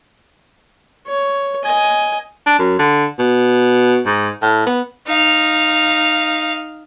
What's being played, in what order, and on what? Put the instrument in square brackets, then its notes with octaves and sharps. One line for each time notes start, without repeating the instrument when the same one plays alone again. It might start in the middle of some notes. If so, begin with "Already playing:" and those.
[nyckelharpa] C#5
D#5 G#5
[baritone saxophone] D4
F#2
D3
B2
G#2
A2
B3
[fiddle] D#4 F5